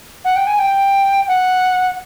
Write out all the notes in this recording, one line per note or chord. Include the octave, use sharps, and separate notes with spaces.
F#5
G5
G#5
G5
F#5